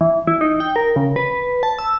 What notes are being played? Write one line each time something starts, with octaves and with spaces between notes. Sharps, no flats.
E3
E4
D#4
G5
A#4
C#3
B4
A5
E6